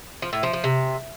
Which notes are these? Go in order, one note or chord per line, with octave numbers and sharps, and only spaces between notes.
F3
A2
F3
F3
C3